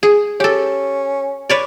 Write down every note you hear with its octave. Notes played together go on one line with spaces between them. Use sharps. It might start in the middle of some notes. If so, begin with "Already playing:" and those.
G#4
C#4 G4 A4
B4 C#5 D5